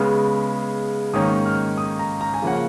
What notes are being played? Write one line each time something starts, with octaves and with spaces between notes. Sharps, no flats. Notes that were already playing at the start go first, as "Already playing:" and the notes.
Already playing: C#3 G#3 B3 F6
G#2 D#3 A#3 C#4 D#6
F6
D#6
A#5
A#5
G#5
C#3 F3 A#3 C#4 F#5